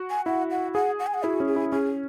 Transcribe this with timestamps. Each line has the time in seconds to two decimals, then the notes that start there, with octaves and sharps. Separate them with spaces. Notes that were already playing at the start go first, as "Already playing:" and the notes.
Already playing: F#4
0.10 G#5
0.26 E4 F#5
0.51 F#5
0.74 G#4 F#5
0.99 F#5
1.07 G#5
1.14 F#5
1.24 E4 F#4
1.40 C#4
1.48 G#4
1.56 E4
1.72 C#4 G#4